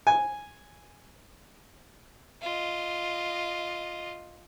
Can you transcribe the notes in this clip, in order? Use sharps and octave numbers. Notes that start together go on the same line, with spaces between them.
G#5
F4 D#5